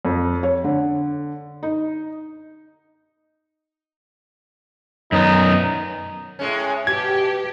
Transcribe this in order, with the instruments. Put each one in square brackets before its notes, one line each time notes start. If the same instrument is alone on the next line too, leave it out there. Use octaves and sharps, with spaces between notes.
[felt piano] F2
C#5
D3
D#4
[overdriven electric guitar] F#2 B3 [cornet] D#4
[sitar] A2 G#3 C#4
[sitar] B2 [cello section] G4 [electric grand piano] G#6